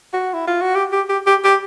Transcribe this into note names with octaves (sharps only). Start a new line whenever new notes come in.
F#4
E4
F4
F#4
G4
G4
G4
G4
G4